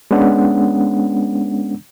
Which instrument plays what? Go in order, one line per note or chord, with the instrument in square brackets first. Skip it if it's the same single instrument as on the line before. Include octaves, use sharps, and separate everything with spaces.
[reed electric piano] G#3 B3 C#4 D4 F#5